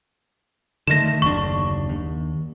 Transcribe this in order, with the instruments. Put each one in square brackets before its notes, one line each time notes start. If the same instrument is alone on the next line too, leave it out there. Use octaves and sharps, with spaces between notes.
[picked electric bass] D3 D#3 A3 [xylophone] A#6 E7
[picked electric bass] F#1 D#2 D4 [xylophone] C#6
[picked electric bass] D#2